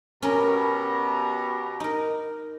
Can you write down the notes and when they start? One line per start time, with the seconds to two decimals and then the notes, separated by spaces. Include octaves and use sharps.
0.22 B2 C#4 G4 A#4 A#5
1.80 D#4 A#4